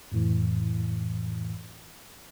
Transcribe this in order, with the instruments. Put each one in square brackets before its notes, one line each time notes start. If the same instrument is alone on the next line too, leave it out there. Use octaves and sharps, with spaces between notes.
[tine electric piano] F2 A2 E3